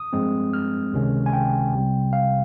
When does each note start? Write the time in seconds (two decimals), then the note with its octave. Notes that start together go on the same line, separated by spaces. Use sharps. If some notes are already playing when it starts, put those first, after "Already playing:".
Already playing: D#6
0.13 G2 F3 G#3 C4
0.53 F6
0.93 C#2 C3 D#3 G#3 C#4
1.26 G#5
1.33 G5
1.73 C2 C3 G3
2.13 F5